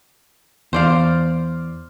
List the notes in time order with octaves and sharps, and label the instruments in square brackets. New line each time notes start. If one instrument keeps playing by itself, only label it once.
[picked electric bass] E2 [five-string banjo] C5 D5 F5